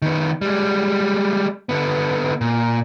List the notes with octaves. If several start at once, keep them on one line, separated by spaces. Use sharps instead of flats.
D#3 B3
G3 G#3
D3 B3
A#2